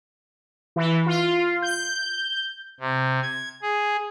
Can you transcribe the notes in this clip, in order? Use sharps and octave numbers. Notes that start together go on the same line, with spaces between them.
E3
F4
G6
C3
G#6
G#4